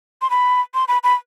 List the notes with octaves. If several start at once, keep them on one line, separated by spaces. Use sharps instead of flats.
C6
B5
C6
B5
B5